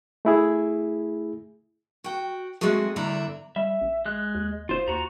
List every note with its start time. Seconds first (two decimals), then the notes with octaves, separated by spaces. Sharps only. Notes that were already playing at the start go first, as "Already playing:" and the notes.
0.25 A3 E4 G#4
2.04 F#4 G5
2.61 G#3 A3 C4 F#4 G#4
2.96 E2 G2 D3 A3 E4 A#5
3.56 G3 E5
3.81 A1
4.06 G#3 F#6
4.35 D#2
4.69 E1 F4 C5
4.88 D#2 F4 F#4 A#5